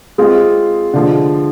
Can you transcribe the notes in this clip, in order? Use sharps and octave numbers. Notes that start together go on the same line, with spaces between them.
G#3 C4 F4 G#4
D3 F3 G#3